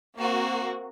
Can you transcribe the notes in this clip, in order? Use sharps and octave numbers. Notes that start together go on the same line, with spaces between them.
A#3 C4 F#4